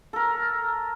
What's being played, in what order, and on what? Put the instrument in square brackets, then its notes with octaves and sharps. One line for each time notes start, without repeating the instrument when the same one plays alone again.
[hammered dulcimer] A4 A#4